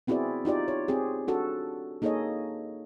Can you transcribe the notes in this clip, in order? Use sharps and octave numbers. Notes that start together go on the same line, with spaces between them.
B3 C4 E4 F#4 G#4 D5
D#4 F4 G4 D5
C#5
C4 G4 G#4
D4 F#4 A4
A#3 D#4 G#4 A4 C#5 D#5